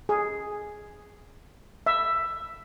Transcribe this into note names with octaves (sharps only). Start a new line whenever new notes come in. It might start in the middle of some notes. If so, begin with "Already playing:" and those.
G#4
E5